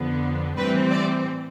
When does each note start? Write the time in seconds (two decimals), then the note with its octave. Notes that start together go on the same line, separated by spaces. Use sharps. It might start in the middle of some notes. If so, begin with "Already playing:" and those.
Already playing: F2 D3 F3 B3
0.57 A2 E3 G3 C4 B4
0.91 D5